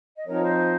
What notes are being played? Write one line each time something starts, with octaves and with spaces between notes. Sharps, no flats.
D#5
F3 C4 D#4 A#4 C#5
C5 D#5